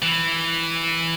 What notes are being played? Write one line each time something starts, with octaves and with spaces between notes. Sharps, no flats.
E3